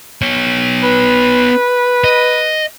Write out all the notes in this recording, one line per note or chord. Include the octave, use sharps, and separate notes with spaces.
B3 C#5
B4
D#5